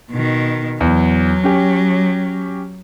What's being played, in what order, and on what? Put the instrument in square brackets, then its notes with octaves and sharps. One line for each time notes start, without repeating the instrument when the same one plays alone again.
[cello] B2 D#3
[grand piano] E2 [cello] F#3
[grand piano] C#4 G4